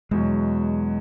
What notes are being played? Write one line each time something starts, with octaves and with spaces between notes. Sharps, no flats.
E2 B2 F#3 G#3